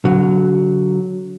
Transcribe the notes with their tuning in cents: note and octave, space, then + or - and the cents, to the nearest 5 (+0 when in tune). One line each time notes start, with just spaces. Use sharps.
D3 -35 F#3 +5